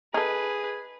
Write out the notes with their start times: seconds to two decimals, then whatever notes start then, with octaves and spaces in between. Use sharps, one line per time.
0.14 D#4 G#4 A4 B4